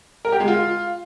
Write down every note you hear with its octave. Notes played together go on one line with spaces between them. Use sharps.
A#4
G4
G#3
F4